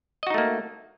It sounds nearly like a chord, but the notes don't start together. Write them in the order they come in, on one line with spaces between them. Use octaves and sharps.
D#5 F#4 D#4 A3 A#3